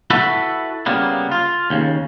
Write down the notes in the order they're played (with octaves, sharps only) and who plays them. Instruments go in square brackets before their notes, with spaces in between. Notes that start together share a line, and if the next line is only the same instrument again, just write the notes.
[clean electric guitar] E4 F#4 A4 B4 E5 B5
C#3 G3 A#3 B3
F4
D#2 C#3